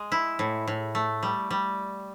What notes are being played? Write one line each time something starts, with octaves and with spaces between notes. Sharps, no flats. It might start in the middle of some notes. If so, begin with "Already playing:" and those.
Already playing: G#3
E4
A2
A2
A3
G3
G3